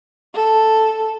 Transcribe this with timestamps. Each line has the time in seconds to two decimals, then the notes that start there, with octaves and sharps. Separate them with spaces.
0.35 A4